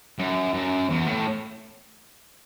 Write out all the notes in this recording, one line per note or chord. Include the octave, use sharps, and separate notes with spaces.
F#2
F#2
E2
A2